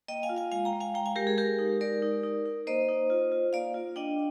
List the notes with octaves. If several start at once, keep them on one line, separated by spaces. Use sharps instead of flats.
A#3 D#5 G5
F5 G#5
F4
F5 G#5
G#3 F5 G#5
G5 A#5
G#3
F5 G#5
G#3 G5 A#5
F5 G#5
G#3 G4 A#4
G#4
G#3 G4 A#4
D#4
G#3 A#4 D5
D#4
D#4
D#4
A#3 C5 D#5
D#4
F4
F4
A#3 D5 F5
F4
D4 D#5 G5